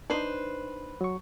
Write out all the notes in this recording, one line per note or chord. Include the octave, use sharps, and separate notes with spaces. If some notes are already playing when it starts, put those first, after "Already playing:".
D4 D#4 B4 C5
F#3 C#6